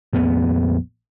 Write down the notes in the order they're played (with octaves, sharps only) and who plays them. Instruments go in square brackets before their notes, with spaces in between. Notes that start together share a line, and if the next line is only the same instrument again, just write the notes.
[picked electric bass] A#1 F2 B3